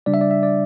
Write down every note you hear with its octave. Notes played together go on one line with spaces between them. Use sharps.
C#3 G3 D4 D5
E5
D5
E5
D5